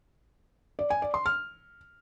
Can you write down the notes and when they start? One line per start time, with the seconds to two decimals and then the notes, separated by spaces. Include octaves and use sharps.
0.79 D5
0.90 G#5
1.02 D5
1.14 C6
1.26 F6